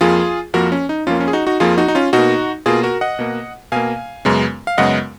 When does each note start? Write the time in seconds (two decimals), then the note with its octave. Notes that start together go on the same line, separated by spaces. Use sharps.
0.01 F2 F3 A#3 F4 G#4
0.54 F2 F3 A#3 F#4 A#4
0.72 C#4
0.89 D#4
1.07 F2 F3 A#3 C#4 F4
1.20 C#4 F4
1.28 G#4
1.33 D#4 F#4
1.47 D#4 F#4
1.60 F2 F3 A#3 F4 G#4
1.78 D#4 F#4
1.88 D#4
1.95 C#4 F4
2.13 B2 A#3 D#4 F#4
2.66 B2 A#3 F4 G#4
2.83 F#4 A#4
3.01 D#5 F#5
3.19 B2 A#3
3.72 B2 A#3 F5 G#5
4.25 F#2 C#3 G#3 B3
4.67 F5
4.78 F#2 C#3 G#3 B3 D#5 F#5